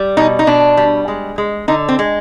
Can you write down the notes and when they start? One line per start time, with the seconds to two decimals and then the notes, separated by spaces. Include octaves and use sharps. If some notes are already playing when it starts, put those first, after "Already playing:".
Already playing: G3
0.17 B2 D#4
0.39 D#4
0.47 B2 D4
0.77 G3
1.08 G#3
1.38 G#3
1.68 D3 D#4
1.89 C4
1.99 G#3